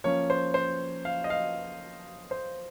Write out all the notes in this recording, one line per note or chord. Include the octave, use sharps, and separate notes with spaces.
F3 A#3 C#4 C#5
C5
C5
F5
D#5
F5
C5